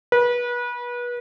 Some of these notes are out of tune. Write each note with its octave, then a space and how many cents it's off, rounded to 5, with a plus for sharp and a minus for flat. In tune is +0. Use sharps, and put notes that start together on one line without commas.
B4 -30